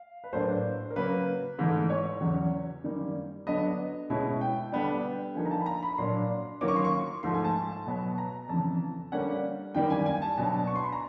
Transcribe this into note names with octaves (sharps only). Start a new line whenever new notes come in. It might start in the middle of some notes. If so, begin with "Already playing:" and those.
Already playing: F5
B4
A2 F#3 A#3 D4 C5
A#4
C#3 F#3 A#3 B4
G#2 E3 A3
C#5
E2 C#3 F#3
F#2 D#3 G3 A#3
D3 F#3 B3 D4 D#5
B2 G#3 C#4 E4
G5
D3 G3 B3 D4
D3 F3 A#3 D#4 G#5
A#5
A5
B5
A#5
B5
A#2 F#3 A#3 D4 C6
D#3 F#3 A#3 C#4 D6
C#6
C6
C#6
G#2 F3 A3 C6
G#5
A5
B2 F#3 B3
A#5
F2 C#3 E3 A5
D3 G3 A#3 C#4 F#5
F#2 D#3 G3 A#3 G5
G#5
G#5
A5
B2 F#3 B3 D4 A5
C#6
C6
B5
A#5